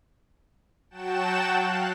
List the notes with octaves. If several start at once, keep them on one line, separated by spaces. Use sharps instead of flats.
F#3 F#4 F#5 G5 A5 E7
F5 F#6